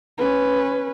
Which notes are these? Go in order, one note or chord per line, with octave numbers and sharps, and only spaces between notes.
C#4 B4